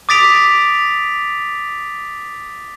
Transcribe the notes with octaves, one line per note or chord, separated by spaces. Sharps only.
D6 D#6 A6 B6 D7 F7